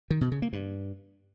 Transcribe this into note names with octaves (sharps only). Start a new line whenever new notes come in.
D#3
B2
C#3
A#3
G2